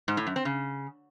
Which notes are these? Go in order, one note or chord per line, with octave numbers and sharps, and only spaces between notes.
G#2
A2
F#2
C4
C#3